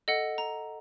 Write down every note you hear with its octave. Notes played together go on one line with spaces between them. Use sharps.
A4 D#5 F#5
A#5